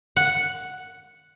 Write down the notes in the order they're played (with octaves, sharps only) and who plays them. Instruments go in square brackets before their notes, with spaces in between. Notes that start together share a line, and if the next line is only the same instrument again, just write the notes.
[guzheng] F#5